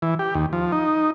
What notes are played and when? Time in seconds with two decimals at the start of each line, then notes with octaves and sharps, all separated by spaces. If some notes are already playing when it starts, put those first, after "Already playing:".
0.02 E3
0.19 G4
0.35 D#2
0.53 F3
0.72 D#4